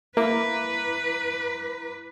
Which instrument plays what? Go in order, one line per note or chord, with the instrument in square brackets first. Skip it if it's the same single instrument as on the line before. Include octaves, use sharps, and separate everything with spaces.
[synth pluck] A#3 [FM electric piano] E4 A#5 D6 [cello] B4